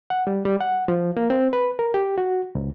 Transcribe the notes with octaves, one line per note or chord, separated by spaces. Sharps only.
F#5
G3
G3
F#5
F3
A#3
C4
B4
A#4
G4
F#4
C#2